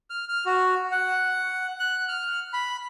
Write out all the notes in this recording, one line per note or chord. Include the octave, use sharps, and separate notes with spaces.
F6
F6
F#4
F#5
F#6
F6
B5